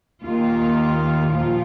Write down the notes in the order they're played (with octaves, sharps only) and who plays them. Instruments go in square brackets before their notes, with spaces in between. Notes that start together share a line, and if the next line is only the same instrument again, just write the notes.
[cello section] D#2 D#3 A#3 F4
A#2 F3 F4